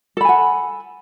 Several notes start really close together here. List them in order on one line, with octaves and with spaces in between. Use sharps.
A4 B5 G#5 F#5